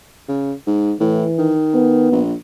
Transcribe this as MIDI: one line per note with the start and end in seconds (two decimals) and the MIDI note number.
0.29 0.52 49
0.67 0.93 44
1.00 1.25 45
1.00 1.54 52
1.38 2.07 51
1.74 2.22 59
2.12 2.33 34